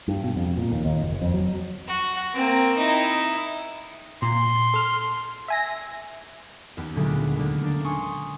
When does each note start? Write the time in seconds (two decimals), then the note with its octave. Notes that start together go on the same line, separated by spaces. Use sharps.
0.08 G2
0.23 B2
0.36 F2
0.57 A#2
0.72 D#2
0.85 D#2
1.02 F#1
1.21 F2
1.34 F#3
1.88 F#4
2.34 A#3 C4
2.77 D#4 E4
4.22 A#2 C6
4.74 A4 F6
5.48 E5 G#5 A#6
6.77 D#2 B3 E6
6.95 D2 A#2 D3 F#3 G#3 A3
7.15 B3
7.36 D#2 D3
7.62 A#3 D4
7.85 G#5 C6 C#6 D#6